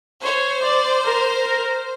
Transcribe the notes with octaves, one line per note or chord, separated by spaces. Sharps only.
C5 C#5
D5
A#4